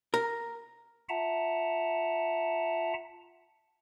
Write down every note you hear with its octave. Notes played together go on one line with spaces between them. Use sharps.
A#4
F4 E5 F#5 A5 A#5